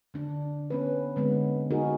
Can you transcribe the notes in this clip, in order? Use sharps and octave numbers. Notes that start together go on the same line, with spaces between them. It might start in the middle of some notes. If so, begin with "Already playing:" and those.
D3 D4
B3 C#4 B4
D3 G#3 B3 C4
D#4 F#4 G#4 A#4